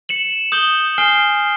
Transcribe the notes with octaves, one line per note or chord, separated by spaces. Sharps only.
C#7 E7 F#7
D#6 G6 F#7 G7
G#5 F6 C7 G7